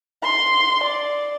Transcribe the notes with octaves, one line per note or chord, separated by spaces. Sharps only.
C6
D5